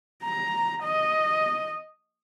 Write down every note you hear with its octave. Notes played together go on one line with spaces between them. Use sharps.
A#5
D#5